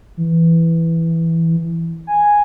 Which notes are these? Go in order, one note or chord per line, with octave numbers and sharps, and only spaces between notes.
E3
G#5